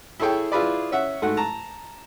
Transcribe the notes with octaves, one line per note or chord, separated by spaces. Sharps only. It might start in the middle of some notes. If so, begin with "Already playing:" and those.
E4 G#4 A4 C#5 G5
E4 F4 G#4 B4 D5
C#4 E5 F#5
G#2 A3 F#4 F#5
A5 A#5